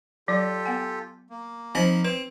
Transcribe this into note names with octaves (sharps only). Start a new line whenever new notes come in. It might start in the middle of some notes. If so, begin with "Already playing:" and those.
F#3 F4 G4 A4 D5
B3 F#5 G#5
A#3
F3 C4 D#4 C5 B5
C4 B4